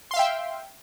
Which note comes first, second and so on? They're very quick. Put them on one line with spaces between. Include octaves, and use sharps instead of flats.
C6 F5 E5 G5